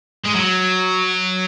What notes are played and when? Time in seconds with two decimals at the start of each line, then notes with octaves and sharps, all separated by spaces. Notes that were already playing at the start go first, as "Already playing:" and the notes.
0.25 G#3
0.34 F#3